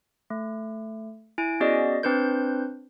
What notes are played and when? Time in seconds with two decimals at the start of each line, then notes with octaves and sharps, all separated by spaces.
0.30 A3
1.38 E4 G#5 D7
1.60 B3 C#4 F#4 G#4 D5 D#5
2.03 C4 D4 B4 C5 G6